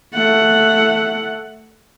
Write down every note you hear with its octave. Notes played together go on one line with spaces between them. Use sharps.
A3 F#5